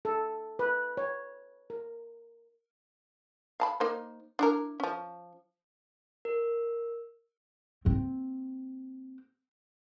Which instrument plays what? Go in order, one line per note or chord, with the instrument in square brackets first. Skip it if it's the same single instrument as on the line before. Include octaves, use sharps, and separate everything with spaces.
[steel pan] A4
B4
C#5
A#4
[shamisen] F5 A5 B5
A#3 D#4 C5
D4 E4 A#4
F3 C#4
[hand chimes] A#4
[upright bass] A#3 C4